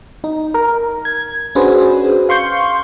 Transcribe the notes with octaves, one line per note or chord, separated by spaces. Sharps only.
D#4
A#4
G#6
C#4 D4 F#4 G#4 B4 C5
F5 C6 C#6 G6